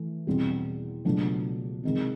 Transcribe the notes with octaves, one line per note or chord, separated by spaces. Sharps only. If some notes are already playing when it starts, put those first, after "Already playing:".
Already playing: E3 A3
E2 B2 G3 C4
C#2 B2 F#3 A3 D4
C3 D#3 G#3